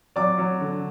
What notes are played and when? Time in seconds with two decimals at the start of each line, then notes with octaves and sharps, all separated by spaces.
0.16 F#3 D5 D6
0.38 F#3
0.61 D3